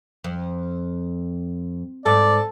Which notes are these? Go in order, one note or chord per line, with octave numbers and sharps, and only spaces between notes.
F2
G#2 A4 D5